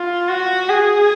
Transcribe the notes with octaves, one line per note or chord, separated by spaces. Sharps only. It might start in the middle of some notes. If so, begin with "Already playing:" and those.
Already playing: F4
F#4
G#4